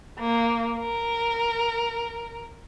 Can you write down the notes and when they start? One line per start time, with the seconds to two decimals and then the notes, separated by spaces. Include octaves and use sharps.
0.20 A#3
0.79 A#4